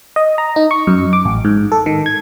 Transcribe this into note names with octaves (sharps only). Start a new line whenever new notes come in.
D#5
A#5
D#4
C#6
F#2
D6
A1
G#2
A4
D#3
G#6